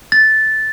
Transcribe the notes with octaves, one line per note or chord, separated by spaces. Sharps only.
A6